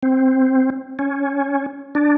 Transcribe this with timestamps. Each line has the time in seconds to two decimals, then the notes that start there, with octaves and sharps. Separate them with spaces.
0.03 C4
0.99 C#4
1.95 D4